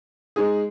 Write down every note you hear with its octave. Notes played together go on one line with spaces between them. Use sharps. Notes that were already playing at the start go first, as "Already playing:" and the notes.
G#3 D#4 G#4